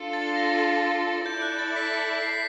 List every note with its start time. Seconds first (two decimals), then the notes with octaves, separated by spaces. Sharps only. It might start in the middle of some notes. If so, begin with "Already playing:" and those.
Already playing: D4 F4 A4
0.13 A6
0.36 A#6
0.58 A6
1.25 E4 A4 D5 G6
1.42 F#6
1.59 A6
1.76 B6
1.93 B6
2.15 B6
2.22 C7
2.29 B6